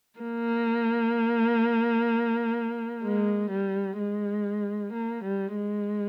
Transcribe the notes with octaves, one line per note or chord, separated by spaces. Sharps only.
A#3
G#3
G3
G#3
A#3
G3
G#3